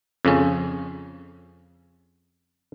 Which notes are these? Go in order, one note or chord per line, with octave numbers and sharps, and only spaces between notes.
F2 C#3 C#4